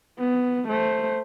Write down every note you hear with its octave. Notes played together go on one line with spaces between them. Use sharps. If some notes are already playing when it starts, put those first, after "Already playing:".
B3
A3 C5